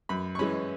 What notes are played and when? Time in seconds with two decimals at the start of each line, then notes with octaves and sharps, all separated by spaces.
0.09 F#2 B5
0.35 C#6
0.39 E3 G#3 C#4 B5